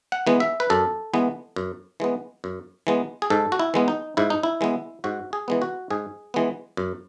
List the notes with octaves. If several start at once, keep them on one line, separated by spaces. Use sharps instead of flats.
F#5
E3 G#3 B3
E5
B4
F#2 A4
E3 G#3 B3
F#2
E3 G#3 B3
F#2
E3 G#3 B3
G#4
G#2 A4
F#4
E4
E3 G#3 B3
D#4
G#2 E4
D#4
E4
E3 G#3 B3
G#2 F#4
G#4
E3 G#3 B3
F#4
G#2 G#4
E3 G#3 B3
F#2